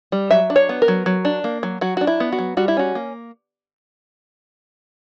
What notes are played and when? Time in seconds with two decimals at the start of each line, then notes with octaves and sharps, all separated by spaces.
0.12 G3
0.31 F#3 E5
0.50 D4
0.56 C#5
0.69 B3
0.82 A#4
0.88 F#3
1.06 F#3
1.25 D4
1.44 A#3
1.63 F#3
1.81 F#3 F#4
1.97 D4 F#4
2.07 E4
2.20 B3
2.32 F#4
2.39 F#3
2.57 G3 F#4
2.68 E4
2.77 C#4 F#4
2.95 A#3